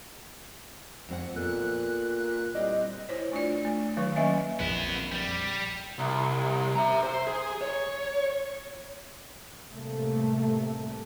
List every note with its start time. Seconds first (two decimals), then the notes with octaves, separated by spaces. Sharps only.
1.09 F2 C4 F#5
1.36 A#2 B3 A4 F#6
2.55 G3 C4 E4 D5 D#5
3.09 E4 C5 C#5
3.32 A3 D4 F4 D5
3.65 A3
3.97 D#3 F#3 B4 C#6
4.15 D#3 A#3 C#4 D#5 E5 G#5
4.60 A#1 F2 B3 E4
5.12 G3
5.98 C2
6.75 E5 A#5
7.04 C5
7.27 G#4
7.61 C#5
9.71 A2 C3 G3 A3 A#3